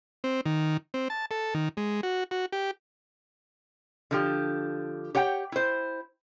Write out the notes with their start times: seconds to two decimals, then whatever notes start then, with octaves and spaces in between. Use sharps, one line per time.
0.24 C4
0.45 D#3
0.94 C4
1.10 A5
1.31 A4
1.54 D#3
1.77 G#3
2.03 F#4
2.31 F#4
2.52 G4
4.11 D3 F3 G4
5.15 G4 C#5 F#5 G5
5.52 E4 C5